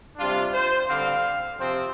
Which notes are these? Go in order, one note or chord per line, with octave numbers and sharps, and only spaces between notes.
C3 G3 D4 F4
C5
D3 G3 C4 F5
C3 F3 C4